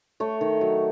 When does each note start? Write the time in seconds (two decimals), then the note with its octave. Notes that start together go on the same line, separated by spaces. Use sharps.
0.20 A3 C#5
0.41 D#3
0.61 F#3